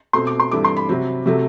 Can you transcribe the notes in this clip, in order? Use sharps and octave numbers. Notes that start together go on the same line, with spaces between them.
B2 A3 C4 C6
D6
C6
G2 E3 A3 C4 D6
C6
B5
C3 F#3 C4
C3 F#3 A3